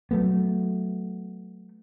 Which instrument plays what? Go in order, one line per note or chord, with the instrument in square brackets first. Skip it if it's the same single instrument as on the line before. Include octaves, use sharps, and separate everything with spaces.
[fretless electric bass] F#3 A3 B3